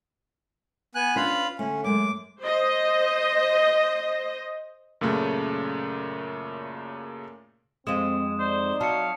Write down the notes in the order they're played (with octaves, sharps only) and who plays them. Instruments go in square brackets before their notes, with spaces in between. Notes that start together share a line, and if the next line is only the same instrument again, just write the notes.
[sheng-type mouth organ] B3 G#5 F#6
[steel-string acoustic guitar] C#4 D4 B4 [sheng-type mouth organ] F4 F5 B5
[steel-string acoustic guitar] D3 A3 [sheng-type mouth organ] C#4
[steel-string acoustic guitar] F#2 G#3 A3 [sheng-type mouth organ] D6
[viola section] C5 D#5
[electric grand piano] F#2 A#2 C#3 A3
[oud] F2 G#3 [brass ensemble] C4 [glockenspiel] D#6 E7
[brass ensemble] D#4 D5 [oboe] C5
[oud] F#3 [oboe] F5 [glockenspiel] A5 C#7